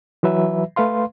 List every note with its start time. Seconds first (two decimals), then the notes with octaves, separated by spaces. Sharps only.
0.23 E3 F#3 B4 E5
0.76 A3 B4 F5 C6